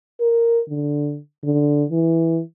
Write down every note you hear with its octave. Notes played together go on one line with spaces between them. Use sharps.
A#4
D3
D3
E3